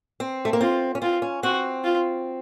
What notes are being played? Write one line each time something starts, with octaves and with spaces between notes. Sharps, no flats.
C4
A3
A#3
C4 F4
C#4
C4 F4
C#4
C4 F#4
F4